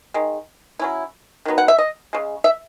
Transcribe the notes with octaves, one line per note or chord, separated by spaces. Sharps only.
D#3 G#3
F#3 C#4 E4
D#3 F#3 B3
F#5
E5
D#5
C#3 G#3
E5